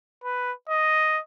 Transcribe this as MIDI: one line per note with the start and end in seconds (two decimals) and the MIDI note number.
0.24 0.52 71
0.69 1.20 75